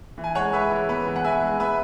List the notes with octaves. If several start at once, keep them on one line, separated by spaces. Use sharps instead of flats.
E3
G#5
G#3 C#5 F#5
G#3 B4 E5
E3
B3 B4
E3
F#5
E3 E5 G#5
G#3
B3 B4 E5